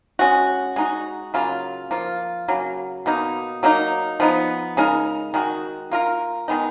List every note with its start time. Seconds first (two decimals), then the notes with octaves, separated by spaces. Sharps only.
0.19 G#3 C#4 F#4
0.76 G#3 D#4 F#4
1.34 C#3 F#3 A#3 F4
1.91 F3 A#3 F4
2.48 C#3 F#3 A#3
3.06 B2 A#3 D#4
3.63 F#3 A#3 D#4
4.20 F3 B3 D#4
4.77 C#3 G#3 D#4 A#4
5.34 D#3 G#3 D#4 F#4
5.91 A#3 F4 A#4
6.48 D#3 G#3 B3 D#4